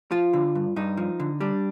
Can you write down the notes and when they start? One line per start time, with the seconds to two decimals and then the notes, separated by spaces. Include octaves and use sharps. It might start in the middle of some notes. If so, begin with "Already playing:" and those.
0.11 F3 F4
0.33 D3
0.55 G2
0.76 G2 D#4
0.97 F3
1.20 D3
1.41 G3 D4